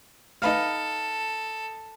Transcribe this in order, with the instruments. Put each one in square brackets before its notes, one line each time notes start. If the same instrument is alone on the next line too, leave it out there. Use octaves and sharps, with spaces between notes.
[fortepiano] D#4 B4 F5 [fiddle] A4